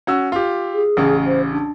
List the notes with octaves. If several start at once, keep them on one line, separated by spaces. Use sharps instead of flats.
C#4 F#4 E6
F4 G4
G#4
A1 C#3
C5
D4